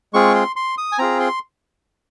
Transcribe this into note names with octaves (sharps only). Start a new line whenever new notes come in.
G#3 C4 F4 G#4 C#6
C6
C6
D#6
G#5
C4 F4 G#4 A#5
C6